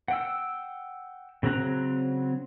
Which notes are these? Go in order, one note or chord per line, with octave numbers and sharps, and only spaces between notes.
F#5 G5 E6
C#3 F#3 C4 A#5 F#6